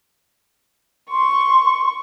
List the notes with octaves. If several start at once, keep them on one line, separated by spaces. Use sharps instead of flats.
C6 C#6